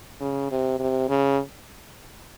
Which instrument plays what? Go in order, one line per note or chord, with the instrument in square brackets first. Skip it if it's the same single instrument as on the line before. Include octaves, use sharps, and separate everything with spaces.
[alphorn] C#3
C3
C3
C#3